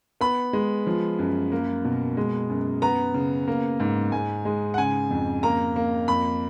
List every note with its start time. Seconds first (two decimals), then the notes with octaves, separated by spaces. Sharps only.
0.21 B3 B5
0.53 G#3
0.87 F3
1.19 F#2
1.52 A#3
1.84 B2
2.17 G#3
2.50 F#2
2.82 B3 A#5
3.14 C#3
3.48 A#3
3.80 G#2
4.12 G#2 G#5
4.45 G#3
4.74 F#5
4.78 C#3 G#5
5.10 F2
5.43 A#3 A#5
5.76 A#3
6.08 F2 B5